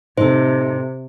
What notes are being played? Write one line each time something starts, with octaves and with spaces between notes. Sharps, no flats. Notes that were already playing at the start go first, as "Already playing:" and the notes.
A2 C3 D#4 A4 C5